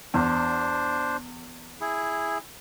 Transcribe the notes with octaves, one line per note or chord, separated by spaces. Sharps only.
E2 D4 C5
E4 G#4